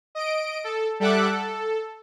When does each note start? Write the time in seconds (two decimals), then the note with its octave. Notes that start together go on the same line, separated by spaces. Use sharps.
0.15 D#5 D7
0.64 A4
1.00 G3 A4 E5 F#5 D6 F#6
1.31 A4